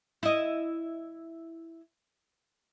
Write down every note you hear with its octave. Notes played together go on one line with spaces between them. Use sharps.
E4 D#5